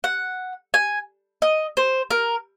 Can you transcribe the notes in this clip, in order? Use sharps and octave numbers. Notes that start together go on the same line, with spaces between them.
F#5
G#5
D#5
C5
A#4